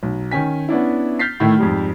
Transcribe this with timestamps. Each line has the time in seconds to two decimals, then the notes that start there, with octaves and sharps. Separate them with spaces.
0.03 B1
0.31 D#3 C#4 G#5 B6
0.69 B3 C#4 D4 E4
1.19 F6 G6 A6 B6 C7
1.40 A2 D#3 A3 E4
1.59 F2 G#2 G3